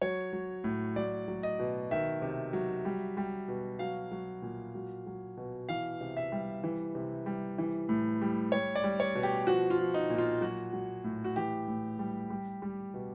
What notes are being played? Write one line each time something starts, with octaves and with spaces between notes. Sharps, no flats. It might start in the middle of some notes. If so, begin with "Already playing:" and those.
F#3 C#5
F#3
A2
F#3 D5
F#3
D#5
B2
D#3 E5
C3
F#3
G3
G3
B2
F#3 F5
F#3
A#2
F#3
F#3
B2
E3 F5
C3
E5
G3
E3
C3
G3
E3
A2
G3
G3 C#5
D5
G3
C#5
B2
G4
F3 F#4
F4
F3
D#4
A#2
F4
F#3 F#4
F#3
A2
F#4
E3 G4
A2
G3
G3
G3
B2